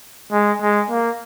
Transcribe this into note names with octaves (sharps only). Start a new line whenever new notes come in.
G#3
G#3
A#3